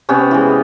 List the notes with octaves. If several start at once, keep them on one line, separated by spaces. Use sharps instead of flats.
C3 B3 C#4
E3 G#3